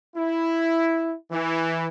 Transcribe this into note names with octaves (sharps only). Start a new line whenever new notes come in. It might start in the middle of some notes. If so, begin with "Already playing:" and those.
E4
E3